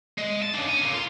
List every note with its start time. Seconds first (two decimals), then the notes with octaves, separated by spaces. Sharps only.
0.18 G#3
0.42 A5
0.54 C#3 D4
0.68 C#4 G#5
0.81 D3 A#3
0.94 F4